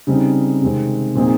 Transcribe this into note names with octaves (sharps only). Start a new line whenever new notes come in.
C#3 G3 C4 D#4
C3 D#3 G#3 C4
A#2 F3 C4 D#4 G#4